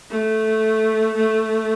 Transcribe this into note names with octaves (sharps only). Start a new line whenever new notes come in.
A3
A3